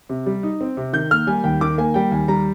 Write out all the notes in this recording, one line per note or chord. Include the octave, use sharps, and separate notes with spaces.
C3
G3
D#4
C4
C3
D#3 G6
A#3 F6
G3 G#5
D#2 G5
D#3 D6
A#3 G#5
G3 G5
D#2 G#5
G3 A#5